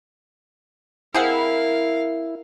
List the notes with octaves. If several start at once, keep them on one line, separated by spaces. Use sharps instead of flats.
C4 E4 G#4 A#4 F5 F#5